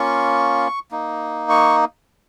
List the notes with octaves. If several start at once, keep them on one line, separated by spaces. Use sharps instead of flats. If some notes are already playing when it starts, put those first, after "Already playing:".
Already playing: A#3 C#4 F4 C#6
A#3 D#4
C#6